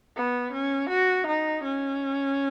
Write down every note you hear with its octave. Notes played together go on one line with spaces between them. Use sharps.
B3
C#4
F#4
D#4
C#4